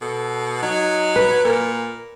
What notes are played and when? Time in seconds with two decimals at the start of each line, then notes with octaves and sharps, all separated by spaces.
0.02 B2 A4
0.63 F#3 D#4
1.16 B4
1.45 A#2 A#4